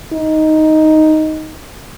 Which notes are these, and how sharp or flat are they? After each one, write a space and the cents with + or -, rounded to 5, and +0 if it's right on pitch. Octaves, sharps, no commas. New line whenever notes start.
D#4 +5